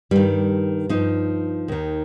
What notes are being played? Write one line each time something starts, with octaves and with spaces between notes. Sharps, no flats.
G2 D#3 G3
G2 F3 D#4
D#2 D#3